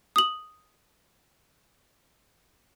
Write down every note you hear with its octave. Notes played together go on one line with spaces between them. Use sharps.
D#6 F#7